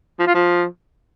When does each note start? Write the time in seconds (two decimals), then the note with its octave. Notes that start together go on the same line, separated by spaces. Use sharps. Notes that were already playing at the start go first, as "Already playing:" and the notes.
0.19 F3
0.27 F4
0.34 F3